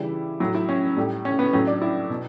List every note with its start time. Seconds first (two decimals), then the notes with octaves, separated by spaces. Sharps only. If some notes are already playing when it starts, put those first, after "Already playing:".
Already playing: C#3 E3 G3 E4
0.40 A2 F#3 E4
0.55 E4
0.69 C#4
0.97 A2 G3
1.25 C#4
1.39 B3
1.53 A2 F#3 C#4
1.67 D4
1.82 E4
2.10 B2